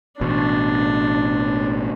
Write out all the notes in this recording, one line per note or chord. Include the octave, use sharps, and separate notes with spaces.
A1 B2 D4